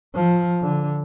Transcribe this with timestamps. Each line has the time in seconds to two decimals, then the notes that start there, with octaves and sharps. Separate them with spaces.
0.15 F3
0.62 D3